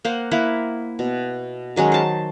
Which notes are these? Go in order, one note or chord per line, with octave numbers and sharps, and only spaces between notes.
A#3 C5 F#5
A#3 E4 F#5
B2
D#3 F#3 G#3 C#4
C5 A5